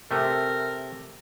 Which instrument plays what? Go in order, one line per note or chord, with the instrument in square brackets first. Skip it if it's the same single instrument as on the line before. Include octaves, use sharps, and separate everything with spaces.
[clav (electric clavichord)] C3 A3 [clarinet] A#4